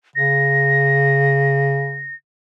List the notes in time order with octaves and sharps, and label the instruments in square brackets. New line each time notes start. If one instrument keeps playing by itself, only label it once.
[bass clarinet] C#3 [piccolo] A#6